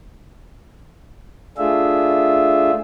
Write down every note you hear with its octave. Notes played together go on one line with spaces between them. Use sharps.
A3 D4 F4 G#4 E5